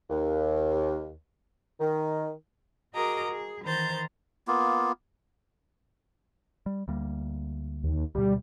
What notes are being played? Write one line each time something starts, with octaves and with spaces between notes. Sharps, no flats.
D#2
D#3
F#4 G#4 A#4 D#5 A#5 D6
G#4
D#3 E3 C5 A#5 G6 A6
A#3 B3 F4
G3
D2 G3 A#3
D#2
D2 B2 G3